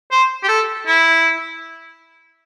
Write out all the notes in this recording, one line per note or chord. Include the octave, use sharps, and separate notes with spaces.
C5
G4
A4
E4